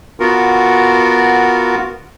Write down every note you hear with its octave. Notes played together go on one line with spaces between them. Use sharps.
B3 F4 F#4 A#4